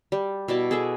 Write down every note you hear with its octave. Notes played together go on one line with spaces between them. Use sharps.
G3
B2 E4 D5 A5
G#4 A4 B4 E5